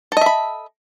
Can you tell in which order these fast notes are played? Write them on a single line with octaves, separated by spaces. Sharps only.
A4 D#5 E5 B5